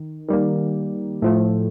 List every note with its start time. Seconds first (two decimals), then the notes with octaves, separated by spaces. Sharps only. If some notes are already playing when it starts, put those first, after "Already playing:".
Already playing: D#3
0.28 D#3 G3 A#3
1.22 A2 F3 A3